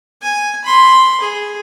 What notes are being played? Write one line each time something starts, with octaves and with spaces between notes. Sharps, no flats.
G#5
B5 C6
G#4